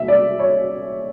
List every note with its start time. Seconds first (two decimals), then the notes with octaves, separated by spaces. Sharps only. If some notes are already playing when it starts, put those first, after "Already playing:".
Already playing: E5
0.08 D5
0.39 C#5